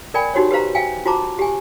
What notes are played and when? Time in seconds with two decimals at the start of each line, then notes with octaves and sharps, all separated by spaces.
0.14 A#4 D5 G5 G#5 B5
0.34 D#4 F#4 G4 C5 C#5
0.51 G4 B4 C5 F5 A#5
0.75 F5 G5 G#5
1.06 F4 F#4 C5 A5 A#5 D6
1.39 G4 G#5